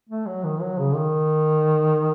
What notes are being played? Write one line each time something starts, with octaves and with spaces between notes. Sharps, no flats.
A3
F#3
D#3
F#3
C#3
D#3